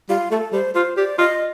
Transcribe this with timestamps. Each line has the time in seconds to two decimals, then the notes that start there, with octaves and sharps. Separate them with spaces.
0.09 G3 F4
0.31 A3 A4
0.53 G3 C5
0.75 F4 C5
0.97 G4 D5
1.18 F4 D#5